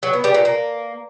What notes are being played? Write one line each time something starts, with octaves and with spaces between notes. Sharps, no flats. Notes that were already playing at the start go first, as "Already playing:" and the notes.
F#3
B3
G3
A#2
A#3